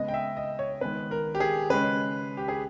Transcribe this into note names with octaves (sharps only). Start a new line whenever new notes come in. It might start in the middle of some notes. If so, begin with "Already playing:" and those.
Already playing: C#3 G#3 B3 D#5
G5
E5
D#5
C#5
D#3 G#3 B3 B4
A#4
G4
G#4
C#3 G#3 C#4 B4
G4
G#4